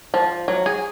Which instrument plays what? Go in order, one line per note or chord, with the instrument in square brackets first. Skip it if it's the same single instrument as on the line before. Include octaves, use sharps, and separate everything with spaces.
[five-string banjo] F3
F#3
G#4